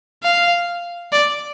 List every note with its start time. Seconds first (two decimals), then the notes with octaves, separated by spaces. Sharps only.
0.23 F5
1.12 D5